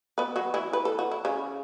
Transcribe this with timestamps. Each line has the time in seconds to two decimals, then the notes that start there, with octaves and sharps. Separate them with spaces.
0.18 B3 B4
0.36 F#3 F#4
0.54 E3 E4
0.73 B4
0.85 A4
0.99 F#4
1.11 E4
1.25 C#3 C#4